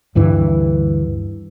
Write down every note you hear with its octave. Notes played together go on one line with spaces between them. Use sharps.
D2 G2 D3 E3